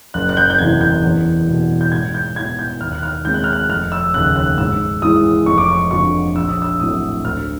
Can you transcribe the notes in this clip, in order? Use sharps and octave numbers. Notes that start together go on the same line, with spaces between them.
F#1 F#6
F#6
G6
G6
E2 C3 E3 G3 G#6
G6
E2
B2 G3
G6
G#2 G#6
G6
E3 G3 B3 E4 G#6
G6
D#2 F6
F#6
F6
D#3 G#3 C4 G6
F#6
F6
F#6
F1 F6
E6
D#2 C#3 F#6
F#6
G#2 E6
E3 G#3 D#6
F1 C#6
D6
C#6
F2 D3 F3 C#6
A#1 E6
D#6
E6
A2 F#3 A3 C4 D#6
D2 F6